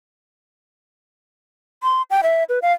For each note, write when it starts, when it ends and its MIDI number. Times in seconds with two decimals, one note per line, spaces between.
1.83 2.02 84
2.10 2.21 79
2.23 2.44 76
2.49 2.59 71
2.62 2.73 77